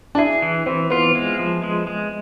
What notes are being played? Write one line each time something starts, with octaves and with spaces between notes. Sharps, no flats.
D4
E4 G#4
E3
E3 C4
B3 F4
G#3
F3
G#3
G#3